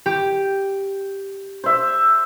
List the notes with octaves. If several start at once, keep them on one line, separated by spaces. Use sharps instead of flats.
G4
C5 E5